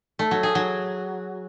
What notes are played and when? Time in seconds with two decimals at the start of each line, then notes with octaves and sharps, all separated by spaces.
0.19 A3
0.31 F#3
0.43 G#4
0.55 F#3